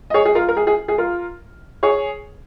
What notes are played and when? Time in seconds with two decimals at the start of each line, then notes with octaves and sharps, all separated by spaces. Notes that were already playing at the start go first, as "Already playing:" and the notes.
0.10 D#5
0.14 G#4 C#5
0.25 G#4
0.35 F4 A#4
0.48 A#4
0.57 G#4
0.67 G#4
0.88 G#4
0.98 F4 A#4
1.83 G#4 C#5